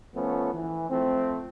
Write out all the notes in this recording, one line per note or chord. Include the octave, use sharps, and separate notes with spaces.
F3 A3 B3 C#4
E3
F3 A3 C4